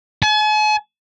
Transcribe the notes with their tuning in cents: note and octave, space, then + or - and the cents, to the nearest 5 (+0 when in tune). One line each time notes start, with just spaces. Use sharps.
G#5 +45